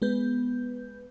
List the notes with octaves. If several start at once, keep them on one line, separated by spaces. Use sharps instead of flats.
G#3 B3 B4 G6